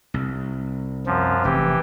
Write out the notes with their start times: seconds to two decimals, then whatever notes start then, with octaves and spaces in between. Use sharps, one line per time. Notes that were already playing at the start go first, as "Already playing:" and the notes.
0.14 C2
1.06 F#2 F3
1.45 F1 E3 G4